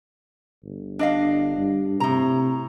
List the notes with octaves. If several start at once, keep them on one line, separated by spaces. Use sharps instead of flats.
G1
D4 D#5 F5
G2
A2 C3 A#5